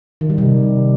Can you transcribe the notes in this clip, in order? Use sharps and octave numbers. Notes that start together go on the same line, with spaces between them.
D#3
G3
C3